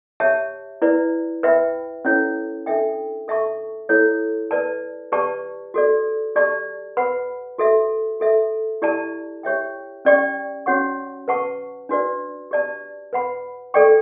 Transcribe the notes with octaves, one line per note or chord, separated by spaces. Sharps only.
G4 C#5 E5 A5
E4 B4 D5
B4 E5 G5 B5
C#4 E4 A4 C#5
D4 A4 E5 G5
A4 E5 A5 C#6
E4 A4 C#5
B4 D5 A5
G4 B4 D5 A5 C#6
F#4 A4 D5
G4 D5 A5 C#6
B4 F#5 B5
F#4 A4 E5
F#4 A4 E5
E4 G4 D5 A5
G4 C#5 E5 G5
C#4 G4 D5 G5 C#6
C#4 F#4 C#5 F#5 C#6
B4 F#5 A5 C#6
D4 F#4 B4 D5
G4 D5 A5
B4 F#5 B5
A4 D5 G5 C#6